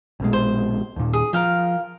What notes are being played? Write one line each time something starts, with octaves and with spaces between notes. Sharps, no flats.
A#1 B2 G#3
C5
D#2 A#2
G#4
F3 A#4 F5 G5